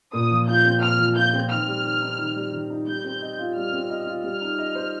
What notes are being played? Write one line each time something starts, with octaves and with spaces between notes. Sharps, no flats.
A#2 D#6
F3
F4 G6
C4
A#2 F6
F3
F4 G6
C4
D#3 F6
G3
D#3
D#4
D#3
G3
D#3
D#4
G3 G6
C4
D#5
F4
G3 F6
C4
D#5
F4
G3 F6
D#4
D#5
C5